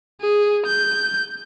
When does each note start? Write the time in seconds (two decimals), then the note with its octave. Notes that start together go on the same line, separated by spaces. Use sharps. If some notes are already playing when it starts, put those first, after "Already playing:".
0.21 G#4
0.66 G6